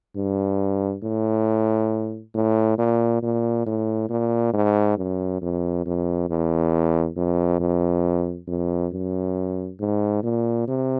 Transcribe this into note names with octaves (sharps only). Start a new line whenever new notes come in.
G2
A2
A2
A#2
A#2
A2
A#2
G#2
F#2
F2
F2
E2
F2
F2
F2
F#2
G#2
A#2
C3